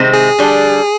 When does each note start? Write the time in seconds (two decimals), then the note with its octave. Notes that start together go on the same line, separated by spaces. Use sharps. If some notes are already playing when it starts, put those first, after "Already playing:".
Already playing: C3 D#3 G#3 C4
0.13 G#4
0.38 D3 G3 D4